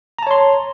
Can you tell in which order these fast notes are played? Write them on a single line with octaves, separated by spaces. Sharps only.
A#5 A5 C#5 C6